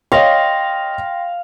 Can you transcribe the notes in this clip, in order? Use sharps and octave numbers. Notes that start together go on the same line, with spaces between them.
C#5 D#5 F5 G5 C6 A#6